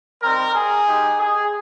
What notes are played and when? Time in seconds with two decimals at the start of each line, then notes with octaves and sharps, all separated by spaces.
0.22 G3 C4 D#4 A#4
0.55 G#4
0.87 G#3 D#4 G4
1.19 G#4